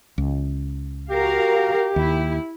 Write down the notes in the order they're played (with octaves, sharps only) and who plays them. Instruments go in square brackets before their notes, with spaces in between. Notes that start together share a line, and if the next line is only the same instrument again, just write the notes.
[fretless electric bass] C#2
[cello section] F#4 A#4 F5 [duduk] G4
[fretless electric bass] D#2 [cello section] E4